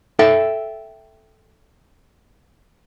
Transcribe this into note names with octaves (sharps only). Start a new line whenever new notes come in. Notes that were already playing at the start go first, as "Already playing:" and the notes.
A4 E5 G5